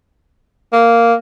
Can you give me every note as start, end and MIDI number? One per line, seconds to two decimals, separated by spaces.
0.73 1.14 58